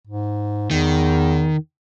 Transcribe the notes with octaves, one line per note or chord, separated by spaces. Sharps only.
G#2
E2 D#3